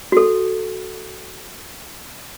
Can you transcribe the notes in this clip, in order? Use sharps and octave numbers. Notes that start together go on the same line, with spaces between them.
F#4 A4